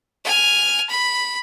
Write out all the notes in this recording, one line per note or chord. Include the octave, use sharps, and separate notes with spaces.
G#5 F6
B5